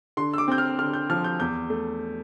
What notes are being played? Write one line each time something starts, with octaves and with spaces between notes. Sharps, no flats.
D3 C6
E6
D6
C4 G6
F6
D3 F6
G6
F3 F6
G6
E2 G6
A3